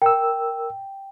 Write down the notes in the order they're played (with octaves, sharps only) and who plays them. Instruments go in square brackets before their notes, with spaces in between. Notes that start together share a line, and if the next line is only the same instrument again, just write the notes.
[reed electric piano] A#4 E6 [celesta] G5